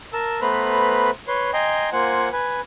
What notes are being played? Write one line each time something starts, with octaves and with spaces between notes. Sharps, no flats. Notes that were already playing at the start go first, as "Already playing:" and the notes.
A#4 A5 E6
A3 B3 B4 C5 A#5 B5
B4 C#5 C6
D#5 G5 G#5 A#5 C6
A#3 F4 C5 F#5 G#5
B4 G#5